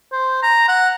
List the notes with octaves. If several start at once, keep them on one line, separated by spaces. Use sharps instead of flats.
C5
A#5
F#5